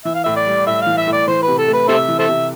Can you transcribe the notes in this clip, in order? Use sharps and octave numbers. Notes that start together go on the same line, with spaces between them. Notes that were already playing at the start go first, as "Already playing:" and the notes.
E3 E5
F5
A2 E5
D5
G3
A2 E5
E3 F5
E5
A2
D5
E3 C5
B4
C3
A4
A3
B4
C3 A4 C5 E5
E3
A4 C5 E5
C3